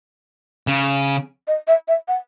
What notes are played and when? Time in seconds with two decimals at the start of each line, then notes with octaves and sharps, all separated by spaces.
0.67 C#3
1.48 D#5
1.68 E5
1.88 E5
2.08 F#5